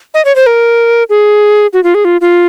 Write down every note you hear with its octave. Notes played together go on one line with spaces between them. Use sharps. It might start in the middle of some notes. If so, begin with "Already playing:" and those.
D#5
C#5
C5
A#4
G#4
F#4
F4
G#4
F4
F4